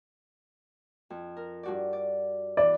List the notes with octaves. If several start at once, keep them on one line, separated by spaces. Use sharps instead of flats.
F2
A#4
G2 F#4 D5
D5
E3 D5